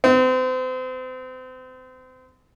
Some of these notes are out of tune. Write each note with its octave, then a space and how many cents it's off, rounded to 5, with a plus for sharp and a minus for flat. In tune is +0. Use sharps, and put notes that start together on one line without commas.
C4 -35